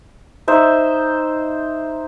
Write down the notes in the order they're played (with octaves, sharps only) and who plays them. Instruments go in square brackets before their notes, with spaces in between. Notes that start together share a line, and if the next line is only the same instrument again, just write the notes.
[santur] D#4 C5 E5